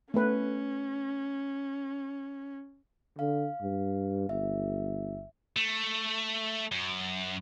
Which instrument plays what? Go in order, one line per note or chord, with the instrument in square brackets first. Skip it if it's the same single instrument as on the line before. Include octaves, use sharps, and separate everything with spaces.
[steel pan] A3 B3 B4 [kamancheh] C#4
[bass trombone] D3 [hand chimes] F5
[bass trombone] G2
[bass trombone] G1 [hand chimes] E5
[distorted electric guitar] A3
F#2